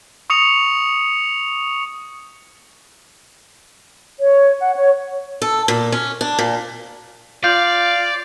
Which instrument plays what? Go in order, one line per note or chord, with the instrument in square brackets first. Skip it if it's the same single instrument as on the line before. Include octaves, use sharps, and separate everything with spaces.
[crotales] C#6 D#6 C#7 F7
[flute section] C#5
F#5
C#5
[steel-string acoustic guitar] A4
A#2
C#4
D4
A#2
[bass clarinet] F4 [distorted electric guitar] D5 [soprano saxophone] F5 [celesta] G6